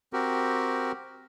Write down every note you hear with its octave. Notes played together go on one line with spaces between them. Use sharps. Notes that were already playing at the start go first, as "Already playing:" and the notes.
C4 F#4 G4 A#4